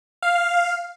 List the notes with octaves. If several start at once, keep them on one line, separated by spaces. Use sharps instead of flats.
F5